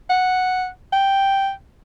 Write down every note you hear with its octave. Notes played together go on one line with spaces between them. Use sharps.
F#5
G5